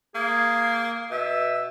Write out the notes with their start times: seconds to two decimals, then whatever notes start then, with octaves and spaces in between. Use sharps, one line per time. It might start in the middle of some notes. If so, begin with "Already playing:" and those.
0.15 A#3 G#4
1.11 B2 E5